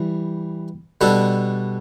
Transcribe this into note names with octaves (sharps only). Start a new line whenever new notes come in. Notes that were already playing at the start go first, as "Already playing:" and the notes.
Already playing: E3 G3
B2 G3 D4 A4